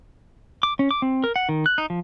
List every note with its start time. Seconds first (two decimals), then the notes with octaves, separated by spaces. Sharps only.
0.63 D6
0.79 C#4
0.91 D6
1.02 C4
1.24 A#4
1.36 F#5
1.49 D#3
1.66 F#6
1.78 D#4
1.90 F3